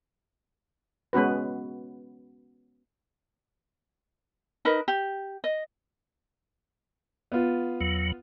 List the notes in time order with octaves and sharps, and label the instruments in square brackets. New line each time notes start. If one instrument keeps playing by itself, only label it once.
[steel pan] G#3 B3 C#4 F#4 B4
[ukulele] D#4 A#4 B4 D#5
G4
D#5
[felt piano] B3 F4
[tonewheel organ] E2 F#3